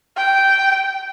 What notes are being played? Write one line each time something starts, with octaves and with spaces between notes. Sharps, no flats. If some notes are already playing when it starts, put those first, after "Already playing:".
G5